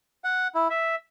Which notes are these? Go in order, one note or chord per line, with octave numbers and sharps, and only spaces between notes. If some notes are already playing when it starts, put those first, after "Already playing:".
F#5
E4
E5